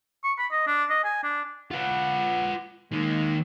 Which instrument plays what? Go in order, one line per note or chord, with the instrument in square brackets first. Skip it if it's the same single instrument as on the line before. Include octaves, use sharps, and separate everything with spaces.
[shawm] C#6
B5
D#5
D4
D#5
G#5
D4
[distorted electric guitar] F4 B4 [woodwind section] F#5
[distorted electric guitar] D#3 A#3 [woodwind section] G#3